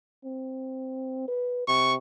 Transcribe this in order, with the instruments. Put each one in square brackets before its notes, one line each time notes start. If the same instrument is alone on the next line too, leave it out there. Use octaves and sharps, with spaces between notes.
[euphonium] C4
B4
[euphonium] C3 [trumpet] C#6